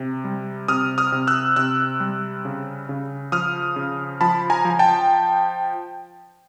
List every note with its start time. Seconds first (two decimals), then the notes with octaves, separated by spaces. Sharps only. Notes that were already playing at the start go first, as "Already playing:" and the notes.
Already playing: C3
0.24 G3
0.68 C3 D#6 F6
0.98 D#6 F6
1.12 C3
1.27 E6 F#6
1.56 C3 E6 F#6
2.00 G3
2.45 C#3
2.89 C#3
3.32 F3 D#6 F6
3.76 C#3
4.21 F3 A5 B5
4.50 G#5 A#5
4.65 F3
4.79 G5 A5